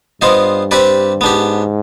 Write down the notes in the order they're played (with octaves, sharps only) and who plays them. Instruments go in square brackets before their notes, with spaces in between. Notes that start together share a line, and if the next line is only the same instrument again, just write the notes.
[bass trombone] G2 [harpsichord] B3 F4 C5 D#5
[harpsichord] C4 G4 B4 D5
[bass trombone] G#2 [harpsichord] B3 D4 G4